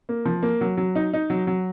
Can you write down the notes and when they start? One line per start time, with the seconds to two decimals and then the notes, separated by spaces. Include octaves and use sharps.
0.09 A#3
0.26 F3
0.43 A#3
0.61 F#3
0.77 F#3
0.95 D#4
1.13 D#4
1.30 F#3
1.47 F#3